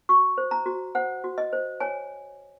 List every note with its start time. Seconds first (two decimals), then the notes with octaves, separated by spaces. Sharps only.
0.09 F#4 C#6
0.38 C5
0.51 A#5
0.66 F#4
0.95 C5 F#5
1.24 F#4
1.38 D#5
1.53 C5
1.80 C#5 G#5